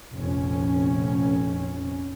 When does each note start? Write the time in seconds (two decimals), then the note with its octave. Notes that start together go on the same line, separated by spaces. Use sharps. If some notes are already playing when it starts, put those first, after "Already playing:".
0.14 F1 A#1 F2 C#4